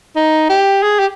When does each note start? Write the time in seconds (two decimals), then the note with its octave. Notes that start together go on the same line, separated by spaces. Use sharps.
0.16 D#4
0.50 G4
0.83 G#4
0.99 G4